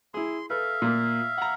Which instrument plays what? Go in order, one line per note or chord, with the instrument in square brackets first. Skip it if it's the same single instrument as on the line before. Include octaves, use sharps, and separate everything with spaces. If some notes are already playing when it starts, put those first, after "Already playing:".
[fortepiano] E4 G#4 [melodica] C6
[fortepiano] A4 B4 [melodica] E5 F5
[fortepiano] A#2 A#3
F#5 A#5